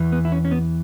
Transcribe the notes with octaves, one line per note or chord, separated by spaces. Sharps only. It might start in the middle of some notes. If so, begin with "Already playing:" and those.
Already playing: E2 E3
B3
E4
C#4
C#4
B3